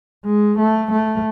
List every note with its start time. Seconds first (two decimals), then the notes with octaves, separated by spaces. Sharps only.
0.25 G#3
0.58 A3
0.91 A3